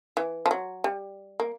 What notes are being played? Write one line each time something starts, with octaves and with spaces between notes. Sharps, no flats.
E3
F3
F#3
G3
A#3